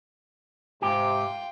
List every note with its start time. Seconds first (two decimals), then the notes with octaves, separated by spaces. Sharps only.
0.82 G#2 C3 F4 G4 G5